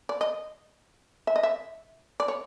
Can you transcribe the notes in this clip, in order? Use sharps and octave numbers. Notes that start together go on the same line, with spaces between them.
D5
D#5
E5
D#5
E5
D5
C#5